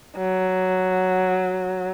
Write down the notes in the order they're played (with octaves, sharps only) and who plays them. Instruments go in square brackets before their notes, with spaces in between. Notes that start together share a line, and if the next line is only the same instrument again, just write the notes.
[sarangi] F#3